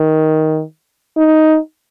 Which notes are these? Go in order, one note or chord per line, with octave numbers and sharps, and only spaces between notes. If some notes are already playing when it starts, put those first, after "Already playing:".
Already playing: D#3
D#4